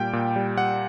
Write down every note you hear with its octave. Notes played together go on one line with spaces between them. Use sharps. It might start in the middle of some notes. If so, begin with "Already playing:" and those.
Already playing: A#2 G3 G5
A#2
G3
G3 F#5